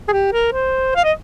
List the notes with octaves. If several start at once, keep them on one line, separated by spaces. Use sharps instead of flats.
G#4
G4
A#4
C5
F5
D#5